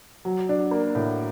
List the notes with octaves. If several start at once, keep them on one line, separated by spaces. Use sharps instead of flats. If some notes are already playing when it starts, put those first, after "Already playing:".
F#3
D4
A#3
A2